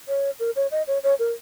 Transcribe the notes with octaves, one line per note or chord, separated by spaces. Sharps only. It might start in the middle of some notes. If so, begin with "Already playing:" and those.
C#5
A#4
C#5
D#5
C#5
C#5
A#4